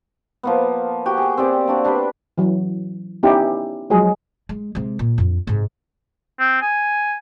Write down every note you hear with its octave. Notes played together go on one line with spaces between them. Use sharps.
F3 A#3 B3
F#4 G4 G5
G#4 G5
C4 G4 D5
A#3 D4 F#4
D4 G4 B4 C5
E3 F#3
B3 C#4 D#4 E4 G4
F3 F#3 G#3 G#4
G#3
C3 G#3
A#2
F2 D4
G#2 C3
C4
G#5